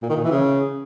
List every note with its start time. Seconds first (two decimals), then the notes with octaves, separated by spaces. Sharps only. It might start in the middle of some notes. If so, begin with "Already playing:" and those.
0.02 A#2
0.10 D#3
0.17 A#2
0.24 E3
0.31 C#3